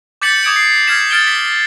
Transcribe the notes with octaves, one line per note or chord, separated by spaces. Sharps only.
D6 G6 A6 B6 C#7 F#7
D6 D#6 G#6 D7 F#7
C7 C#7
F6 G#6 B6 E7
F6 A6 C#7 D7 E7 G7
B6